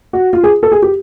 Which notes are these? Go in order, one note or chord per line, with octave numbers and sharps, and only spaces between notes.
F#4
F4
G#4
A4
G#4
G4